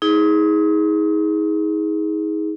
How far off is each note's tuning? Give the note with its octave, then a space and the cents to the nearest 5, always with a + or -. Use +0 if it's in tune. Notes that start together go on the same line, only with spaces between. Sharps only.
D#4 +35 G#4 +0